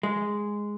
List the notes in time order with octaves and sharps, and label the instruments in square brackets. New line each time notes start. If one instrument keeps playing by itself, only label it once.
[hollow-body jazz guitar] G#3